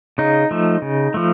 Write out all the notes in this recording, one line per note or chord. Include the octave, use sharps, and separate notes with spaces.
C#3 D#4
F3 A3
C#3
F3 A3